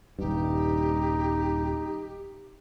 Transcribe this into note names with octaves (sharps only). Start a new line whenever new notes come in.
D#1 G2 D#4 G4